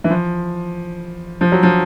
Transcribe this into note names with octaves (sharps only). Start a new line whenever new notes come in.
E3
F3
F3
F#3
F3